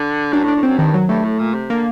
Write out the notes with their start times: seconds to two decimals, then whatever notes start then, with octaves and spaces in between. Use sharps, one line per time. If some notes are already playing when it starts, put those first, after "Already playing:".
Already playing: D3
0.33 F#2 D4
0.44 A2
0.48 D4
0.56 A2
0.63 F#2 C4
0.78 G2 D#3
0.94 F#3
1.09 G2 A3
1.24 A2
1.40 A#2
1.54 C3
1.70 D3 A#3